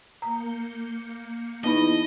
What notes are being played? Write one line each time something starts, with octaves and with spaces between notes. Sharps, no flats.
A#3 A#5 G6 C#7
E2 B3 D#4 D#5 B5